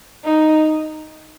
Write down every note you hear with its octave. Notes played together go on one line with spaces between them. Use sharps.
D#4